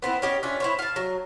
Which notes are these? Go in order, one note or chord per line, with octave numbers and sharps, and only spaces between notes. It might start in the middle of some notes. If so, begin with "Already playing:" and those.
B3 C4 E4
C#4 G4 D#5
C#4 D4 E4 F4
E4 C5 C#5
F5 A5
F#3